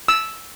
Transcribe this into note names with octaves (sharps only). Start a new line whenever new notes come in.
E6